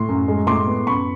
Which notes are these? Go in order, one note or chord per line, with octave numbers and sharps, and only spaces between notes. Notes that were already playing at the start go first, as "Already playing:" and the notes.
Already playing: A2 C6
F#2
G#3
A2 C6 D6
B3
F#2 B5 C#6